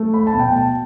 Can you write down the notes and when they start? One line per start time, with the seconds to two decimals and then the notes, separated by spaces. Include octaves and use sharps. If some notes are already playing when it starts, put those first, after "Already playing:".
Already playing: A3
0.14 B5
0.27 A5
0.34 B2
0.39 G5
0.52 A5